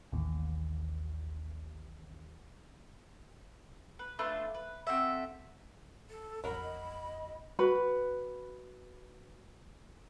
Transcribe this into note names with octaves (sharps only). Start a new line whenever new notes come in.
A1 D#2
B4
A3 D4 F4 B4
B4
C4 F#4 A4 E5
A4
A1 F2 F#3 A#4 B5
D#5
F#4 B4 B5